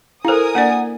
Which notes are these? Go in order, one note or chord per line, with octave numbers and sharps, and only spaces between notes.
E4 A4 A#4 C5 F5 G#5 D#6
A#3 D4 D5 F#5